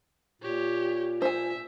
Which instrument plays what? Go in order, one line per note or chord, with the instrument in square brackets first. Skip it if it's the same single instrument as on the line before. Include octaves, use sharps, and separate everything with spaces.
[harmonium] A#2 [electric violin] G4 C#5
[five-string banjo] C5 G#5 [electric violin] E5